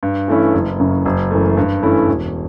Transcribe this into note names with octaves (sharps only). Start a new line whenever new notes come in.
G2
E3 A3 C#4 E4
F#1
F#2 C#3
F#1
F#2 E3 A3
G2
E3 A3 C#4 E4
E1